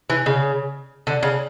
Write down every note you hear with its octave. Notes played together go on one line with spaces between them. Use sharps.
E3
C#3
D3
C#3